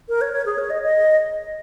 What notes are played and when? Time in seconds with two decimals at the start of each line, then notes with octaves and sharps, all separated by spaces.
0.09 A#4
0.21 C#5
0.33 C#5
0.46 G#4
0.58 C#5
0.70 D#5
0.82 D#5